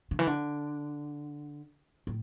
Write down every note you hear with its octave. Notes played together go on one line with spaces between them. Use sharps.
D3
E3
D3
A2